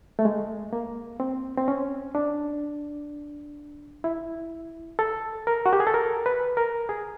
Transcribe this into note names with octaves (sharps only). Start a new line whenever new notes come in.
A3
G#3
A#3
C4
C4
C#4
D4
E4
A4
A#4
F#4
G4
G#4
A4
A#4
B4
A#4
G#4